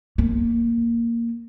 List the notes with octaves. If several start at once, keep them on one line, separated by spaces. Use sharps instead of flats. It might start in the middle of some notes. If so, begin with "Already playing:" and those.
A#3